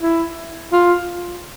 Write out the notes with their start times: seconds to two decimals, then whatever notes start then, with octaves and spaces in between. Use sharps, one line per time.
0.02 E4
0.73 F4